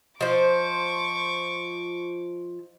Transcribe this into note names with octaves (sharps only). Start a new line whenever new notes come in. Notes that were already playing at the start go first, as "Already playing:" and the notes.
F3 C5 D#5 C#6 D6